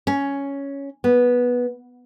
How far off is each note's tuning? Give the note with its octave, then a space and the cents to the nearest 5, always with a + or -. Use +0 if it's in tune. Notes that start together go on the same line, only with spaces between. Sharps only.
C#4 +5
B3 -10